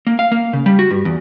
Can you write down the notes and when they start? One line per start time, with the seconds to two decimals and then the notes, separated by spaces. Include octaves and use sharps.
0.07 A#3
0.19 F5
0.32 A#3
0.53 C#3
0.66 G3
0.79 F#4
0.91 G2
1.05 E2